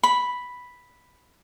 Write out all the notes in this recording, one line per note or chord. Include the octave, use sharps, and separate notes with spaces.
B5